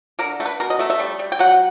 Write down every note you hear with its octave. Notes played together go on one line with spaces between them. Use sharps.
D3 A#4
A3
B4
B2 A#4
D#5
A3 E5
E5
G3
G3
G5
F#3 F#5